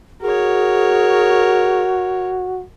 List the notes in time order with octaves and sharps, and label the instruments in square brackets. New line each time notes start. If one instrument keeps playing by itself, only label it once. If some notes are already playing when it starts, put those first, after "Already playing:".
[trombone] F#4 [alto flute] G#4 [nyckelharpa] A#4 C#5